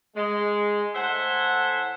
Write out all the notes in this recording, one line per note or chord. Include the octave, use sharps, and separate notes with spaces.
G#3
A2 A4 C5 E5 F#5 G#5